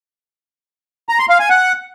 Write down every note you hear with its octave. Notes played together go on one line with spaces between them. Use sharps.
A#5
C6
F5
G#5
F#5